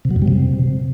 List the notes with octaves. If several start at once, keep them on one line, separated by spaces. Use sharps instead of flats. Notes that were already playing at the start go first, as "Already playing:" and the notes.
C3
F#3
F#2
G3
C3